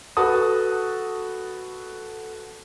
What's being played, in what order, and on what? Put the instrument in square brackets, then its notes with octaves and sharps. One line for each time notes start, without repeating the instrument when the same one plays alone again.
[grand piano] F#4 A4 B4 A5 D#6